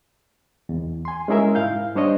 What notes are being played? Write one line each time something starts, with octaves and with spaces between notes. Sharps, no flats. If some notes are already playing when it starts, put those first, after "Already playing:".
E2
G#5 C6
G#3 C#4 E4 G#4 A#4 E5
G#2 E4 F5 G6
G3 D4 C5 C#5 D#5